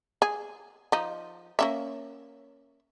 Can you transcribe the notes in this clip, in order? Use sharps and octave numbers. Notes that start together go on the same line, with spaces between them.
G#4
F3 D#4
A#3 C#4 E5